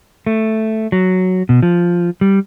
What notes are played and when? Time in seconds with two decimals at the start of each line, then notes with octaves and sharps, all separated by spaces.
0.27 A3
0.92 F#3
1.49 B2
1.63 F3
2.21 G3